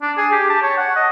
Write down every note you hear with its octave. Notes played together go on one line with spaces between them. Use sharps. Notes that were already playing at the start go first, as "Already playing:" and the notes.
D4
G#4
G4
A5
C#5
F#5
D#5